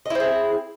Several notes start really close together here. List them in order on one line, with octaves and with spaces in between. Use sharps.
D#5 E4 C4 G#4